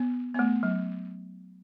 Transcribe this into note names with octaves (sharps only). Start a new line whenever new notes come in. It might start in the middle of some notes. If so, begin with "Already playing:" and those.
Already playing: B3
B3
A3
F#3